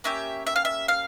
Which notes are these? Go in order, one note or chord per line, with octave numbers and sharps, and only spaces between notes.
A#3 C#4 G4 E5
E5
F5
E5
F5